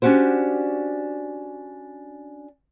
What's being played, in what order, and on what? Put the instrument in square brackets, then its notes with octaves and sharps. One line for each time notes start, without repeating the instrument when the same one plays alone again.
[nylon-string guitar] C#4 D4 F#4 G4 C5